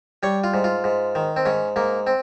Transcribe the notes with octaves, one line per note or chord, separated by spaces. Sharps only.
G3 C#5
F4
G#2
F4
G#2
D#3
C4
G#2 C#4
G#2 A#3
C4